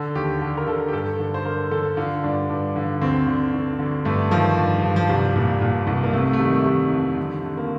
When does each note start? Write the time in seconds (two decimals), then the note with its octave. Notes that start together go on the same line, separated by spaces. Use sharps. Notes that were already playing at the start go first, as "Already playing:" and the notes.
Already playing: D3 A4
0.15 D#2 G4
0.41 D3 G4
0.57 A#4
0.67 D3 A4
0.88 G4
0.93 G2 A4
1.19 D3
1.34 C5
1.45 D3 A#4
1.71 D3 A4
1.97 D3 F4
2.23 G2 D4
2.49 G2
2.76 D3
3.01 D2 C4
3.27 D3
3.53 D3
3.79 D3
4.05 G2 A3
4.31 D#3 F3
4.58 G2
4.83 G2
4.96 F3
5.09 C2 G3
5.36 A#2
5.61 A#2
5.87 C2
6.03 A#3
6.13 C3 A3
6.33 A3
6.39 D#3 G3
6.66 D#3 G3
6.92 F2
7.17 D3
7.43 D3
7.57 A#3